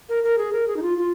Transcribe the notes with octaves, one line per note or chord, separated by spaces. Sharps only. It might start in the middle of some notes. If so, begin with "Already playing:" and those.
A#4
A#4
G#4
A#4
G#4
D#4
F4
F4